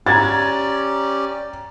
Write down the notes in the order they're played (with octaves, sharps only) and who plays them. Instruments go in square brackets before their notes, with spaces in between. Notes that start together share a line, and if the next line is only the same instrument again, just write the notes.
[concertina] C#4 G4 D5 [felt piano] A#5 G#6 A6